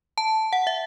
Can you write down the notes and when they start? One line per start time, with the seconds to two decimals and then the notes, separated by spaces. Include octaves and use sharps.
0.18 A5
0.53 F#5
0.67 E5